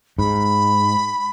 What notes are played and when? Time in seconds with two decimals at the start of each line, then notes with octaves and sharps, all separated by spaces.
0.18 G#2 B5